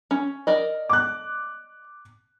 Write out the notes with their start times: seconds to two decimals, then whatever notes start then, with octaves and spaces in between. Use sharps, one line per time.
0.11 C#4
0.47 A#4 D5 D#5
0.89 D6 F#6